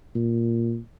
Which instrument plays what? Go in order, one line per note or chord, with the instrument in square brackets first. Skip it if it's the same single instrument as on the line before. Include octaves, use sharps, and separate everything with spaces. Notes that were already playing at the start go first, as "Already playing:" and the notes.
[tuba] A#2